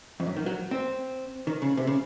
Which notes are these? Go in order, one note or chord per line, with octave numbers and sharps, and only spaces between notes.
F2
F#2
D#3
F#3
C4
D#3
C#3
C3
C#3